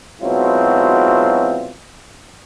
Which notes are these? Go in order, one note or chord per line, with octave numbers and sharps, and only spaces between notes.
G#2 B2 F#3 C4 E4 F4